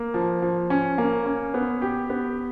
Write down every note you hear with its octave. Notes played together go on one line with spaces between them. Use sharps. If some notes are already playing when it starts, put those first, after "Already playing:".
Already playing: A#3
F3
F3
C#4
A#3
C#4
B3
G4
B3